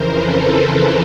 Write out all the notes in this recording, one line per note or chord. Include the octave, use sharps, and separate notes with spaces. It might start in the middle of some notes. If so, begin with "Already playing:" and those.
Already playing: F2 C#3 E3 A#4 C5
A4 B4
A#4 C5